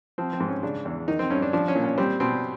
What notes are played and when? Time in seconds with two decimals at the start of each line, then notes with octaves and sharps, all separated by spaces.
0.18 F3 C4
0.33 C4
0.40 G#2
0.48 C#4
0.63 C#3 D4
0.85 E2
1.08 D#3 D#4
1.19 C4
1.30 G2 C#4
1.42 D4
1.53 F3 D4
1.68 C#4
1.75 A#2
1.84 C#4
1.98 G3 C4
2.20 B2 C4